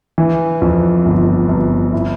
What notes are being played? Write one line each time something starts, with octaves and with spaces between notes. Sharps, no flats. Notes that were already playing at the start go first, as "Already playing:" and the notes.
E3
F2
G1
G1
E4